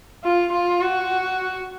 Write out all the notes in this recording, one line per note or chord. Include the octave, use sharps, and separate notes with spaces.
F4
F4
F#4